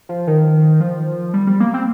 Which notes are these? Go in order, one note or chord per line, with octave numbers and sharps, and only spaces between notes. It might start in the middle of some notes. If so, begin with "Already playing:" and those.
F3
D#3
F3
G3
G3
A#3
C4